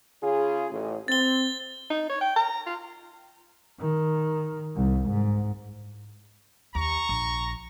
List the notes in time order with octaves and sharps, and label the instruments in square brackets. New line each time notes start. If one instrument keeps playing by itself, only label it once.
[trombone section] C#3 F4 G#4
A1
[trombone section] C4 [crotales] A6 G7
[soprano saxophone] D#4
C#5
G5
A#5
F4
[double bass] D#3
C2
G#2
[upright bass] D#2 [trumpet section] A#5 C#6
[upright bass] A#1